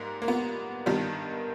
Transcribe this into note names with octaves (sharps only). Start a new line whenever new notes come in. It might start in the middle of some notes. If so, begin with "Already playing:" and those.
Already playing: G#2 G3 A#3
A#3
B3
G2 D#3 G3 B3